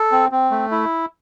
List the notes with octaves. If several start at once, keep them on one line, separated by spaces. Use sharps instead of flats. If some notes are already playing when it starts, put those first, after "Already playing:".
Already playing: A4
C4
C4
A3
E4